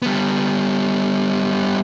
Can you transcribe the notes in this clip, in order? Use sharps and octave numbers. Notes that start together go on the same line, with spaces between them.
G3 B3